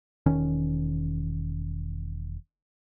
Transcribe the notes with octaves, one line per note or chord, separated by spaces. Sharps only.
E1 D#3 C#4